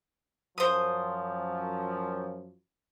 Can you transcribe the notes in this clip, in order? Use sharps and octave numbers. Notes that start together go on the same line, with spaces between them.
F#2 F3 C5 D#6